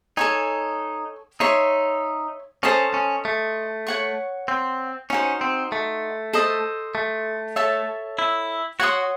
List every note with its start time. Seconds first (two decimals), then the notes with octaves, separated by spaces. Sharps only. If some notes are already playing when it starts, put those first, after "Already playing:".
0.17 D#4 A4 C#5 G#5
1.40 D#4 C#5 E5 C6
2.63 C#4 A4 C5 D#5 A5
2.94 C#4
3.25 A3
3.87 C#5 F#5 C#6
4.48 C4
5.10 C#4 D#4 F#4 C5
5.41 C4
5.72 A3
6.33 A4 C5 D#5
6.95 A3
7.56 A4 C#5 E5 A5
8.19 E4
8.80 F#4 C#5 F#5 C6 D#6